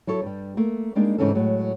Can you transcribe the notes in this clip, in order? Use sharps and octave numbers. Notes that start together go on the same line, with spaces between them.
F#3 E4 A4 C#5
G2 G3
A3 A#3
G3 G#3 A#3 D4 D#4
G#2 C#3 E3 C#4 D#4 A4
A2 F#3 G#3